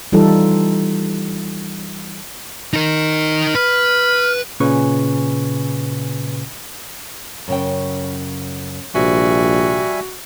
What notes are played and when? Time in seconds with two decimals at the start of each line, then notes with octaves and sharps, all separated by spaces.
0.12 E3 G3 D#4 F4 A4
2.73 D#4 A#4
3.55 B4 F6
4.60 A#2 C#3 C#4 B4 G#5 C#6
7.48 F#2 C#3 G5
8.95 A#1 C3 G3 F#4 E5 G#5